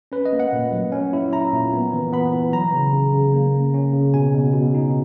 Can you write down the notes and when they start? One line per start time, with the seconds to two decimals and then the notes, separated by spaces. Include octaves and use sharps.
0.12 C#4 B4
0.25 D#5
0.33 A#3
0.40 F#5
0.53 A#2
0.72 F#3
0.92 C#4
1.13 E4
1.33 E4 A#5
1.53 A#2
1.73 B3
1.94 E3
2.13 B3 B5
2.32 E3
2.53 F#3 A#5
2.73 C#3
2.93 C#3
3.13 C#3
3.34 A#3
3.54 C#4
3.74 C#4
3.93 C#3
4.14 B2 G#5
4.34 B2
4.54 B2
4.75 D#4